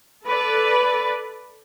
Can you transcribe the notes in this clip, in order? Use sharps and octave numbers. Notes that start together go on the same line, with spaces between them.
A4 B4 D5